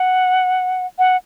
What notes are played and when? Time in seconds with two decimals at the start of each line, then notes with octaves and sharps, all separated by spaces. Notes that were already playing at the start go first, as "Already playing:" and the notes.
Already playing: F#5
0.99 F#5